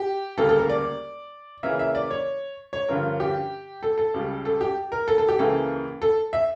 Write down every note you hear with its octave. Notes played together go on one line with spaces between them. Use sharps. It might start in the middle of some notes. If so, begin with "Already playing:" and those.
Already playing: G4
D2 C#3 G3 A#3 A4
A4
A#4
D5
C#3 E3 A#3 C#4 E5
E5
D5
C#5
C#5
G2 D3 F3 C#4 A#4
G4
A4
A4
C#2 C#3 G3
A4
G4
A#4
A4
A4
G4
C#2 C#3 E3 A#3 A4
A4
E5